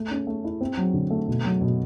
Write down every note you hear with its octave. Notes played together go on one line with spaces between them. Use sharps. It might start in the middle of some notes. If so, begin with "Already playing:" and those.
Already playing: A3
C#4
A3
E4
C4
F#3
D3
A3
B2
F#3
B2